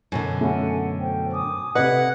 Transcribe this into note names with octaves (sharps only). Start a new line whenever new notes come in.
F#2 B2 D3
A3 C#4 F#5 G#5
C5 G5
G#5 D6 D#6
C3 A4 B4 D#5 F#5 G#6